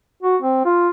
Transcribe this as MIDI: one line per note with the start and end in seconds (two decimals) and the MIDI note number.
0.23 0.36 66
0.42 0.65 60
0.65 0.89 65